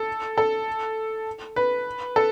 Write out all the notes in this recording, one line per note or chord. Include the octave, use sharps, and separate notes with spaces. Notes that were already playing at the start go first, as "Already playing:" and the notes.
Already playing: A4
A4
B4
A4